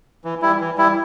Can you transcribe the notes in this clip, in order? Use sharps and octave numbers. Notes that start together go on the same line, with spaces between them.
E3
G3 E4
E3
G3 E4